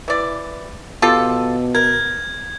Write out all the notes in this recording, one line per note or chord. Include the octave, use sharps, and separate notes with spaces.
E3 D5
B2 F4 G4 A4
A#4 G#6